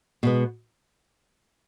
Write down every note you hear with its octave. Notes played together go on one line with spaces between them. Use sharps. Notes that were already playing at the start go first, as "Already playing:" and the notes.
B2 G#3 B3